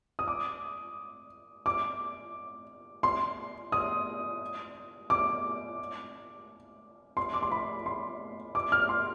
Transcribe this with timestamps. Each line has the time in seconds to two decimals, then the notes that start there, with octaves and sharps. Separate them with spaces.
0.19 D#6
0.28 D6
1.66 D6
3.03 C6
3.72 D#6
5.10 D6
7.17 C6
7.33 D6
7.43 C6
7.52 B5
7.86 C6
8.55 D6
8.72 F6
8.89 C6